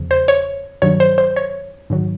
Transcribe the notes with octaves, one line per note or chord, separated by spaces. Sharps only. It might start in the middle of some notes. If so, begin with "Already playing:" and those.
Already playing: E2 C#3 F3
C5
C#5
G2 D#3 F#3 C#5
C5
C5
C#5
G#2 D#3 F#3